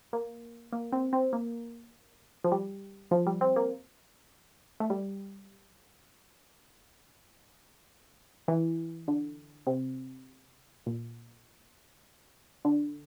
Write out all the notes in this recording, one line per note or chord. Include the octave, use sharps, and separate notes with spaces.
A#3
A#3
C4
C4
A#3
F3
G3
F3
G3
C4
A#3
A3
G3
E3
D3
C3
A#2
D3